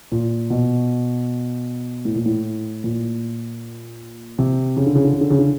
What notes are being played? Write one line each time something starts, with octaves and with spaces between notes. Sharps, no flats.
A#2
B2
A2
A#2
A2
A#2
C3
C#3
D3
C#3
D3
C#3
D3
C#3
D3